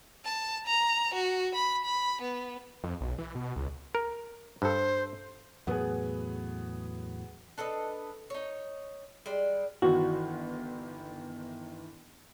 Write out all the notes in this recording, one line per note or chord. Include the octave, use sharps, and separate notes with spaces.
A5
A#5
F#4
B5
B5
B3
F2
B1
E3
B2
C#2
A#4
G2 A4 C5
E2 A2 F#3 B3 G#4
D4 A4 B4 D#5
D#4 C#5
G3 G#3 D5
G1 D#3 E3 F#4